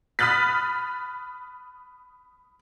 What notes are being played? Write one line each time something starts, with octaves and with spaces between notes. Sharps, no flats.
B5 D#6 F6 F#6 A6 B6